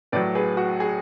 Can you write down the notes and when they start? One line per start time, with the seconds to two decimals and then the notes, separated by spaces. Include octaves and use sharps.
0.12 A2 B4 D5
0.16 F#3
0.35 G#4 B4
0.57 F#4
0.80 G#4